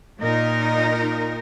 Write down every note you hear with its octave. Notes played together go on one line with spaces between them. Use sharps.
A#2 D#4 A#4